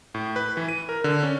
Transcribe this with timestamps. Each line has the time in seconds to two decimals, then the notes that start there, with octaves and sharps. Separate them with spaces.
0.14 A2
0.36 B4
0.57 E3
0.69 D#7
0.89 A#4
1.04 D3
1.23 C#4